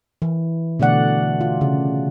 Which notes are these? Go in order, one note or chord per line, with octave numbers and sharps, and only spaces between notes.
E3
B2 D3 A3 D5 F#5
F4
C#3